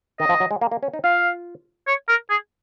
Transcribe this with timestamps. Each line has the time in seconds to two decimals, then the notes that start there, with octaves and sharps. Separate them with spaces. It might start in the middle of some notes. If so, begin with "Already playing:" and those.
0.20 D#3 D#5
0.29 F3
0.40 F#3
0.51 G#3
0.61 A#3
0.71 A#3
0.83 C#4
0.94 D#4
1.04 F4 F5
1.87 C#5
2.09 A#4
2.30 G#4